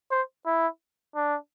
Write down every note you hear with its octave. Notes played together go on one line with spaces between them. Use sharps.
C5
E4
D4